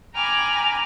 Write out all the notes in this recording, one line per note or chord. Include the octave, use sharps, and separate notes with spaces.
G5 G#5 A#5 B5 D6 F6